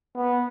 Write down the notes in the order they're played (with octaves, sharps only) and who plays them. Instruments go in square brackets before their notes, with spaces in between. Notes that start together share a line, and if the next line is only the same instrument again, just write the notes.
[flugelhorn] B3